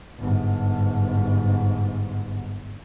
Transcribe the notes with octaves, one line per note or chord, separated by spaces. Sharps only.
G1 G#2